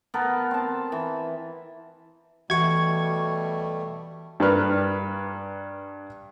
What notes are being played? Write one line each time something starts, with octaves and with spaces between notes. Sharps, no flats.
B3 A4 A#4
C4 A5
E3
B2 E3 G3 A3 F#4 C#6 G#6
G2 D4 A#4 B4 F6